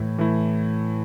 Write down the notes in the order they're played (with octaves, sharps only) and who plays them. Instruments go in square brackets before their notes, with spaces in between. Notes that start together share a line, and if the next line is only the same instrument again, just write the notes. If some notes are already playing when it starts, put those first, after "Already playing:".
Already playing: [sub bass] A2 [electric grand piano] E3 A3 E4
[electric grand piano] E3 A3 E4